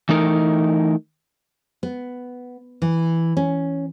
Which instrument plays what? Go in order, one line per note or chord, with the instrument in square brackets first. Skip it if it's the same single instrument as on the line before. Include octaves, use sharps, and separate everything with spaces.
[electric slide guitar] E3 A3 D#4 A#4
[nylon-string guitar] B3
E3
C#4